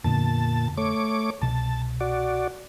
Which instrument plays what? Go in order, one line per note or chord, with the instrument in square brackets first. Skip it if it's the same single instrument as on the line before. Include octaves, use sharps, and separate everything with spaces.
[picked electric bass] F2 D3 B3 [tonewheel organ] A#2 A5
[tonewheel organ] A3 C#5 D6
[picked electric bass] C2 B2 [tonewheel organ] A5
[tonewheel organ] F#4 D5